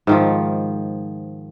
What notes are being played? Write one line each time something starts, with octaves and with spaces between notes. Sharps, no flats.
G#2 D#3 F3